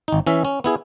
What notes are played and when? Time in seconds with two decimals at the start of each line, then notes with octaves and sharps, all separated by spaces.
0.08 G#1 D#4
0.27 E3 C#4 E5
0.45 C#4
0.64 B3 E4 G#4